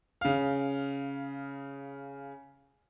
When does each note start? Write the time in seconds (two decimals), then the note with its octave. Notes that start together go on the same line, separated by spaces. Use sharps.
0.21 C#3 F5